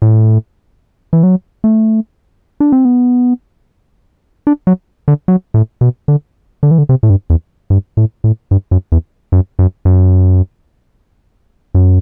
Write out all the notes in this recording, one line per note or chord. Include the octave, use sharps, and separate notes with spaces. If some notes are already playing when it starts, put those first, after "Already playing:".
A2
E3
F#3
A3
D4
C4
B3
D4
F#3
D3
F#3
A2
B2
D3
D3
E3
D3
C3
A2
G2
E2
G2
A2
A2
G2
F#2
E2
F#2
F#2
F#2
F#2